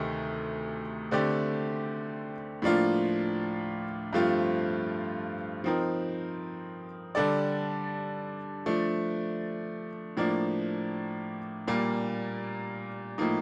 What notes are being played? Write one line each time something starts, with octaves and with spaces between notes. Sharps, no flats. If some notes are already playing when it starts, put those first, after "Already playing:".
Already playing: D2 C3 D#3 A3 D#4
D3 A3 C4 G4 D5
A2 F3 A#3 D4 F4
G2 F3 A3 C4 F4
F3 C4 D#4 A#4
D3 G3 D4 A4 D5
F3 A3 D4
A2 F3 A#3 D4
A#2 G3 A#3
A2 F3 A#3 D#4